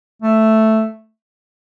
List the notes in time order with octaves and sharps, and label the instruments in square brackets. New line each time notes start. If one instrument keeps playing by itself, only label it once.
[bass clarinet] A3